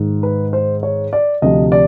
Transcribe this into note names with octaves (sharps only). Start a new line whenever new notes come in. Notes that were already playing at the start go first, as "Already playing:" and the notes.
Already playing: G#2 D#3
B4
C5
C#5
D5
D2 C3 F3 D#5
D5